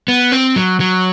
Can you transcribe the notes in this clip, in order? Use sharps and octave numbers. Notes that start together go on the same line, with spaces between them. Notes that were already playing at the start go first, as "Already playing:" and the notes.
B3
C4
F#3
F#3